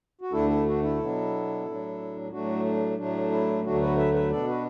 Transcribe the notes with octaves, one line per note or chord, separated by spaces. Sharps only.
F#4
D2 D3 A3 D4 E4 A4
E4 A4
D4 F#4
E4 A4
B2 F#3 B3 D4
A2 F#3 D4
A2 F#3 A3 D4 F#4
D4
A2 F#3 A3 D4
E4
D2 D3 F#3 A3 D4 F#4
F#4 B4
B4 E5
B4 E5
B2 B3 D4 A4 D5
F#4 B4